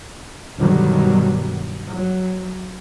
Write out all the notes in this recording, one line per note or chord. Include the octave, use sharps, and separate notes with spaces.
G2 B2 D3 D#3 F#3 G3
F#3